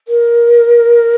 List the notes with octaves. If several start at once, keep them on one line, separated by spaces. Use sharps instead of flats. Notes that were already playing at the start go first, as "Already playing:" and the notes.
A#4